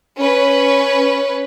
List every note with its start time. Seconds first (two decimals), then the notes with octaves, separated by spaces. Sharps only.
0.19 C#4 B4